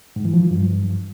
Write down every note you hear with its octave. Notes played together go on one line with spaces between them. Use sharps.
G#2
E3
F3
F#3
G2